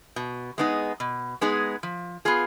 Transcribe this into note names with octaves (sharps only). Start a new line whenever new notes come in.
B2
G#3 B3 D#4 G#4
B2
G#3 B3 D#4 G#4
F3
B3 F4 G#4